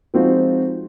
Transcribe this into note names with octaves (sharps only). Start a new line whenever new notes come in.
F3 G#3 C4 D#4 F4 F#4